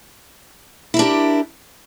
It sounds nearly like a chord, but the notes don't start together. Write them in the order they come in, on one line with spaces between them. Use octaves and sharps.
E4 A#4 D4 G4